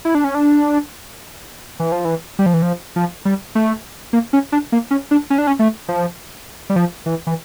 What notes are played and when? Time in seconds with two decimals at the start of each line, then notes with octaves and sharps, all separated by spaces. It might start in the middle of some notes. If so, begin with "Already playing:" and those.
0.05 E4
0.15 D4
0.24 C#4
0.35 D4
1.80 E3
1.92 F3
2.05 E3
2.39 G3
2.46 F3
2.54 E3
2.62 F3
2.96 F3
3.25 G3
3.55 A3
4.13 A#3
4.33 C#4
4.52 D4
4.72 A#3
4.91 C#4
5.11 D4
5.30 C#4
5.38 D4
5.47 C#4
5.59 A3
5.88 F3
6.70 G3
6.76 F3
7.06 E3
7.27 E3